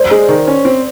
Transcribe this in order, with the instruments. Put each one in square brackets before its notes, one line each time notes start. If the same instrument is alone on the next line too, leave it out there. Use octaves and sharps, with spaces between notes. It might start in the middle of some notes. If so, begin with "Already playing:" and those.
Already playing: [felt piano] C5 D5
[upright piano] G#3
D#3
C#4
C4